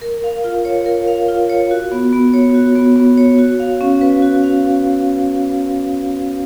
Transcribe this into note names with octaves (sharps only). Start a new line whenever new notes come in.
A#4
F5
F4
C#5
A#4
F5
F4
C#5
F#4
B3
B3
C#5
F#4
B3
B3
C#5
F#4
F5
C#4
B4
F#4
F5